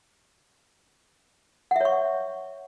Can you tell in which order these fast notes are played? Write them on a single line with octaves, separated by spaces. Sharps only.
F#5 E5 C#5 C#6